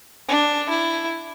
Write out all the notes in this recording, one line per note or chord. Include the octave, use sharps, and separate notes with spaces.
D4
E4